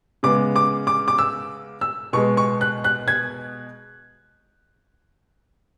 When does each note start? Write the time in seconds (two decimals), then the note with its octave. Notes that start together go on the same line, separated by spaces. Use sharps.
0.23 C#3 G#3 B3 D6
0.56 D6
0.87 D6
1.08 D6
1.18 E6
1.81 E6
2.13 B2 G#3 B3 C#6
2.37 C#6
2.61 F#6
2.84 F#6
3.08 G#6